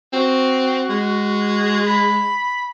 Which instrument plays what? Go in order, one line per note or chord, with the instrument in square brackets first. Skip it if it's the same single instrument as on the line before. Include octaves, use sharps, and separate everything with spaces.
[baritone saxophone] C4 [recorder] F#4
[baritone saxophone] G#3
[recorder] B5